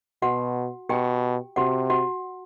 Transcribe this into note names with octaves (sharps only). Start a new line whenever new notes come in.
B2 F#4 F#5
B2 G4 G5
C3 F#4 F#5
F#4 F#5